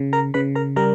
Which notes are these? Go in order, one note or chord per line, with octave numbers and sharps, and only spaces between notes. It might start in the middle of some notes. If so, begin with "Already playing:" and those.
Already playing: C#3
A#4 A#5
C#3 B4 B5
A#4 A#5
G3 A#4 A#5